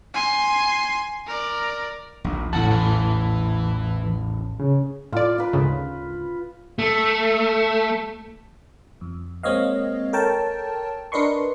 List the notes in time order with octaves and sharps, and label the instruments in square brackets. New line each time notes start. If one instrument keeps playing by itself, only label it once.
[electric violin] G#5 C6
A#4 D5
[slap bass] A#1 D#2
[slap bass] A1 E2 [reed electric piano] A2 A5 [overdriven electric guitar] F#4 F#5
[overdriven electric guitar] E3
[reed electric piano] C#3
[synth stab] A2 D5 [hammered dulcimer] F4
[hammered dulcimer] F4 B4
[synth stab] D2 G#2 C#3
[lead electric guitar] A3
[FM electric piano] F2
G#3 A#3 C4 C#5 D#5 F5
A4 A#4 C#5 G5 A5
D4 A#4 B4 D#5 C6 C#6